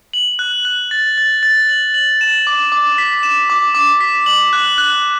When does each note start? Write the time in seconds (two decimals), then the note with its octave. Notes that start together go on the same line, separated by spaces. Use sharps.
0.13 F#7
0.39 F#6
0.65 F#6
0.91 A6
1.18 A6
1.43 A6
1.69 F#7
1.94 F#7
2.21 E7
2.47 D6
2.72 D6
2.98 B6
3.23 E7
3.50 D6
3.75 D6
4.01 B6
4.26 F#7
4.53 F#6
4.78 F#6